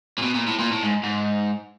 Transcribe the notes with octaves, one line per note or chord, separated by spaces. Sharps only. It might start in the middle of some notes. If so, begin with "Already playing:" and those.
A#2
B2
A#2
A2
A#2
A2
G#2
G#2